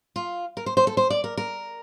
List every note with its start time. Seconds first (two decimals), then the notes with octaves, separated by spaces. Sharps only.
0.16 F4
0.57 A#4
0.66 C5
0.77 C5
0.87 A4
0.97 C5
1.10 D5
1.24 A#4
1.37 A#4